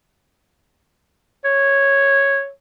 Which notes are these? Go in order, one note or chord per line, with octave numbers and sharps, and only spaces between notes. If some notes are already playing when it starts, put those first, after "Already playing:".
C#5